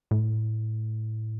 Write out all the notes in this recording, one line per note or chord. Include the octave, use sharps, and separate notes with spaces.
A2